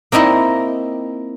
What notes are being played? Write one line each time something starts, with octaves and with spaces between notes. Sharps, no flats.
A#3 C4 D#4 E4 D#5